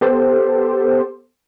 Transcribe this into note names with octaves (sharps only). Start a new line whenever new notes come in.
B3 G4 A4 C5